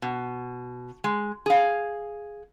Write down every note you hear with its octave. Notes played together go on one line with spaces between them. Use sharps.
B2
G#3
G#4 F5